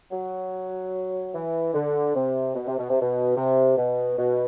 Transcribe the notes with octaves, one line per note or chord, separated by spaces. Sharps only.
F#3
E3
D3
C3
B2
C3
B2
C3
B2
C3
B2
B2